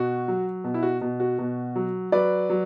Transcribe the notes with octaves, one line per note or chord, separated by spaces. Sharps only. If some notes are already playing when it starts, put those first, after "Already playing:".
Already playing: B2 F#4
F#3
B2
E4
F#4
B2
F#4
B2
F#3
F#3 B4 D5
F#3